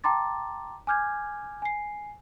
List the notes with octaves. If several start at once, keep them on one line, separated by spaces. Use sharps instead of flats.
G5 A5 A#5 C6 D6 A6
G#5 D6 F6 G6 G#6
G#5 C7